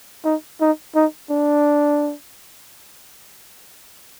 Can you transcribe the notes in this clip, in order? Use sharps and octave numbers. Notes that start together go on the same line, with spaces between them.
D#4
D#4
D#4
D4